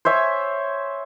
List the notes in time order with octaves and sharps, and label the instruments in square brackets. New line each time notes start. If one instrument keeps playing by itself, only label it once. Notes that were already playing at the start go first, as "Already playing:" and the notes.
[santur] C5 C#5 E5 G#5